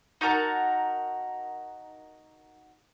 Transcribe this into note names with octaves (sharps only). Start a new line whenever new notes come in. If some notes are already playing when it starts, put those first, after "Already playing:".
D#4 F#4 A#4 A5